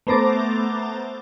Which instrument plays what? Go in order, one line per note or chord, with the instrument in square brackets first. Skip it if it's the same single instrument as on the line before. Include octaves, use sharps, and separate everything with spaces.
[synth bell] A3 B3 C5 A#5 D6 A6